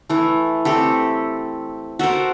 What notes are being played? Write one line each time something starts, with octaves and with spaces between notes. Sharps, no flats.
E3 A3
A3 C4 G4 A4
F#4 A4 A#4 C5